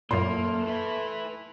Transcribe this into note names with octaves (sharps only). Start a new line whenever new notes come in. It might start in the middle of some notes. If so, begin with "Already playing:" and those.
F#2 A#2 A3 A#3 C6
E4 B4